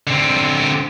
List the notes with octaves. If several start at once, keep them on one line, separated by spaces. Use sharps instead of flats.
D3 C4